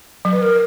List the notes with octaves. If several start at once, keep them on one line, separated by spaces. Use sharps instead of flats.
F#3
B4
A#4